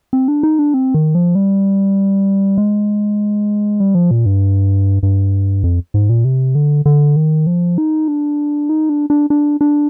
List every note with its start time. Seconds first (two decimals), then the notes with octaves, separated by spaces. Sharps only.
0.13 C4
0.28 D4
0.43 D#4
0.59 D4
0.74 C4
0.94 D#3
1.15 F3
1.35 G3
2.58 G#3
3.80 G3
3.95 F3
4.11 A#2
4.26 G2
5.03 G2
5.63 F2
5.94 G#2
6.09 A#2
6.25 C3
6.55 D3
6.86 D3
7.16 D#3
7.47 F3
7.78 D#4
8.08 D4
8.69 D#4
8.89 D4
9.10 D4
9.30 D4
9.61 D4